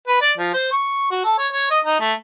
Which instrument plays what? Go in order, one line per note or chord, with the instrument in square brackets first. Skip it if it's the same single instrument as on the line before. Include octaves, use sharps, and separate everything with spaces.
[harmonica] B4
D5
F3
C5
C#6
F#4
A4
C#5
C#5
D#5
D#4
A3